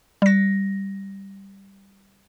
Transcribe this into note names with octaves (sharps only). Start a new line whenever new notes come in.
G3 A#6